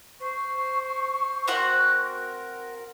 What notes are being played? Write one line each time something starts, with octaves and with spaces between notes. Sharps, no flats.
C5 C#6
C4 F#4 A#4 F#5